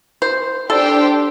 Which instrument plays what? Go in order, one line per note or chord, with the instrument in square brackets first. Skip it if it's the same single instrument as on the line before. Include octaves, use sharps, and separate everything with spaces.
[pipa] C5
[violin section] D4 G4 C5 G5 [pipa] A4